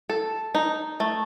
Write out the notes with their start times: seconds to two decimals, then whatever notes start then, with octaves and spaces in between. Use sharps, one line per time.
0.10 A4
0.55 D#4
1.00 A3